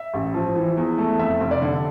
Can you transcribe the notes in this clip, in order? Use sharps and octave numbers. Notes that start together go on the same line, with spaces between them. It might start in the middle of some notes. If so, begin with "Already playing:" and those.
Already playing: E5
A1
F3
E3
E2
A3
F2 E5
F1
D5
D3